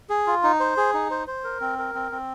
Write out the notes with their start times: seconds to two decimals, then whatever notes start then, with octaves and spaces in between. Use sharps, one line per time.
0.09 G#4
0.27 F4
0.43 D#4
0.60 C5
0.77 G#4
0.94 D#4
1.11 C5
1.27 C5
1.44 A#4
1.61 C4
1.79 A#4
1.95 C4
2.12 C4